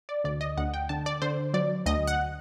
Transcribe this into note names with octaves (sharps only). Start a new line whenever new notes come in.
D5
D2 D5
D#5
D2 F#5
G5
D3 A5
D5
D3 C5
F#3 D5
D2 D#5
F#5